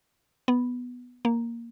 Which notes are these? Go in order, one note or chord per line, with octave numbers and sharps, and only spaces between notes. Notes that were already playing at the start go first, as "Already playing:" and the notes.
B3
A#3